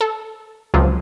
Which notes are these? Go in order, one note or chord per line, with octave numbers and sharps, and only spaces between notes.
A4
C#2 C3 F3 F#3